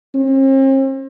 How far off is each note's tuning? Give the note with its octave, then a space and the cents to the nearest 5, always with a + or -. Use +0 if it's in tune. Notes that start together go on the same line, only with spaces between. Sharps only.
C4 +45